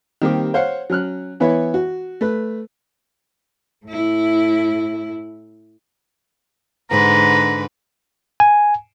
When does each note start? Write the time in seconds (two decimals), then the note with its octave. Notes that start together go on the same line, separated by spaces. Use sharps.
0.22 D#3 G3 A#3 C4 G4
0.54 C5 C#5 F5 F#5
0.90 F#3 C#4 F6 F#6
1.40 E3 B3 E4 B4 C#5
1.74 F#4
2.21 A3 B4
3.86 A2 E4
6.90 G#2 D3 B4 A#5
8.40 G#5